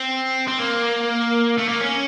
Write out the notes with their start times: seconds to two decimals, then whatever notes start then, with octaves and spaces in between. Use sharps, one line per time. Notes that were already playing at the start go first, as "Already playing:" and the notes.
Already playing: C4
0.48 C4
0.59 A#3
1.58 A3
1.68 A#3
1.80 C#4